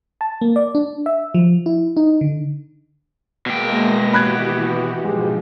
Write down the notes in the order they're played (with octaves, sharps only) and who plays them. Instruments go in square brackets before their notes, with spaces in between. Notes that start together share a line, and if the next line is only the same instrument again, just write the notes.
[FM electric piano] A5
A#3
D5
D4
E5
F3
E4
D#4
D3
[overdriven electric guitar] B2 G5 [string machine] G#3 A#3 A#6
[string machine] E3 F#4 G4 [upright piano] B5 F#6 G#6
[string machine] G#2 B2 F3 [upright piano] G#3 G4